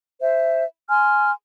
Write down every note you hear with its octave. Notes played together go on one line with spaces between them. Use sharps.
C5 E5
G#5 C6 F6